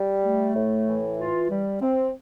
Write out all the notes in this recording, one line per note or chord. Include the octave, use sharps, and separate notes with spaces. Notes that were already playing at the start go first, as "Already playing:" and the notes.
Already playing: G3
A3
A2
E3
F4
G3
C4